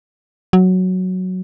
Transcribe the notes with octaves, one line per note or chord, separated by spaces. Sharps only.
F#3